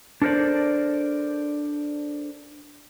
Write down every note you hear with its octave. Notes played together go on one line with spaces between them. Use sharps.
D4 A4 A#4 C5 D5